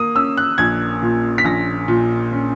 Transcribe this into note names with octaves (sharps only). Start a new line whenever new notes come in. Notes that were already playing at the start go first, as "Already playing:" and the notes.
Already playing: A#3 D#6
C#4 E6
F#6
A#1 G#6
A#2
B6
A#1 A#6
A#2
C#4